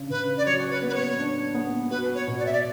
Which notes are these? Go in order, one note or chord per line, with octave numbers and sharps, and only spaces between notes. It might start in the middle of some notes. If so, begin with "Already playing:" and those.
Already playing: C#3 D4
C#3 B4
D5
F#3 C#5
B4
B3
B4
C#5
D4
B3
F#4 B4
C#5
B2
D5
E5
D5